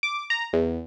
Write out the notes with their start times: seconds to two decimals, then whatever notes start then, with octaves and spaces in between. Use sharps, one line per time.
0.03 D6
0.30 A#5
0.53 E2